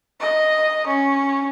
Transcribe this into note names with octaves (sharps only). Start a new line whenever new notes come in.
D#5
C#4